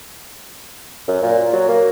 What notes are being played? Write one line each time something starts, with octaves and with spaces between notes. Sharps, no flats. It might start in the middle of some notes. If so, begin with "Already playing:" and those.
F#2
A#2
F#3
A#3